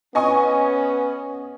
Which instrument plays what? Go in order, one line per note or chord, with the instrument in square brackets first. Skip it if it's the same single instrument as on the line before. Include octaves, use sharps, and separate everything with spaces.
[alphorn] B3 [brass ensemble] C#4 [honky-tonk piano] D#5 G#5 C#6